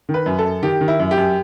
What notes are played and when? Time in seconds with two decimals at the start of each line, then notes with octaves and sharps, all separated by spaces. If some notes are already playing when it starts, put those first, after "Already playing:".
0.09 D#3
0.14 B4
0.26 F#2
0.39 A4
0.45 F#2
0.63 D#3 G4
0.81 D#3
0.88 E4
1.00 F#2
1.11 G4
1.18 F#2